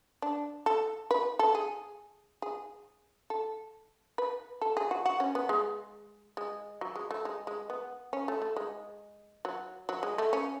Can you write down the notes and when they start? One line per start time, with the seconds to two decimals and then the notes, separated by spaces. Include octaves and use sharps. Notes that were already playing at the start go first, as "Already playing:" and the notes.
0.22 D4
0.66 A4
1.11 B4
1.39 A4
1.55 G#4
2.42 G#4
3.30 A4
4.18 B4
4.61 A4
4.77 G#4
4.91 F#4
5.05 F#4
5.20 C#4
5.35 B3
5.49 G#3
6.37 G#3
6.81 F#3
6.95 G#3
7.11 A3
7.25 G#3
7.47 G#3
7.70 B3
8.13 C#4
8.28 A3
8.42 A3
8.56 G#3
9.45 F#3
9.89 F#3
10.03 G#3
10.18 A3
10.33 C#4